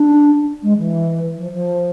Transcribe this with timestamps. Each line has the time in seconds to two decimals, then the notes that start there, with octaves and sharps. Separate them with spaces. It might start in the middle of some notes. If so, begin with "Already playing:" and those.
Already playing: D4
0.63 G#3
0.78 E3
1.37 F3
1.53 F3